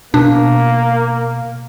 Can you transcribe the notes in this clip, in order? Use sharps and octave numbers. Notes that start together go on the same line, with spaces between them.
B2 A#3 D4